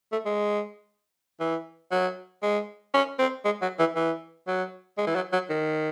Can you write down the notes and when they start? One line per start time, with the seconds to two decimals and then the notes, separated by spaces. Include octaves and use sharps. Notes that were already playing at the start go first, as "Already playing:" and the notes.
0.12 A3
0.25 G#3
1.40 E3
1.92 F#3
2.43 G#3
2.94 C#4
3.19 C4
3.45 G#3
3.62 F#3
3.79 E3
3.96 E3
4.47 F#3
4.98 G#3
5.07 E3
5.15 F#3
5.33 F#3
5.50 D#3